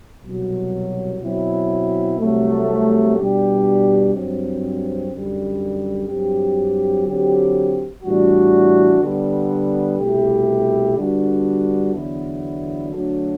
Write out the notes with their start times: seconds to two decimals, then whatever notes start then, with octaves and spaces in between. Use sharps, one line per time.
0.24 C2 B2 F#3
1.22 B2 F#3 C4 E4
2.18 C2 C3 F#3 A3
3.16 B2 G3 D4 G4
4.13 G2 F#3 C4
5.11 F#2 D3 G3
6.08 G2 F#3 C4 G4
7.05 D3 F#3 C4 G4
8.03 A2 E3 G3 D4 F#4
9.00 D3 G3 B3
9.98 C2 B2 A3 E4 G4
10.96 D3 G3 B3 D4 F#4
11.93 E2 D3 F#3 B3 E4
12.90 D3 F#3 A3 D4 F#4